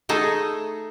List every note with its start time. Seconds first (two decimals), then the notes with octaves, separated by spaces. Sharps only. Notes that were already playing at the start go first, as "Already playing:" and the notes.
0.09 A3 D#4 G#4 A4